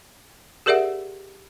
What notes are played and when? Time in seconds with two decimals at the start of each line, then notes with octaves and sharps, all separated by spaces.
0.66 G4 G#4 A#4 D5 E5 F#5